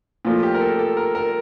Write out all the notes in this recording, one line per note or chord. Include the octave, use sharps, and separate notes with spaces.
A#2 F3 A3 F4
G4
A#4
A4
A4
A#4
A#4